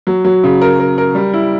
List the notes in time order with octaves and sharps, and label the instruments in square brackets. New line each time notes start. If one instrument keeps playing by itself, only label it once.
[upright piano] F#3
F#3
C#3
A#4
A#4
A#4
G3
E4